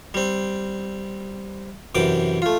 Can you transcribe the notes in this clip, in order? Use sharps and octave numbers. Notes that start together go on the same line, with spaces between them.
G3 C4
F#2 C3 E3 G5 D6
A3 F4